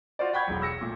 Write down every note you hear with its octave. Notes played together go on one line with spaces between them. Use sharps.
F4 F#4 C5 D5
F#5 G5 B5 C#6 G6 G#6
E1 B1
E6 A#6 C#7
A#2 A3